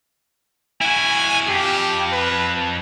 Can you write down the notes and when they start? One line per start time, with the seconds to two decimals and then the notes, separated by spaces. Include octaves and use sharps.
0.81 E4 F#4 G#5
1.48 F2 G4
2.12 B4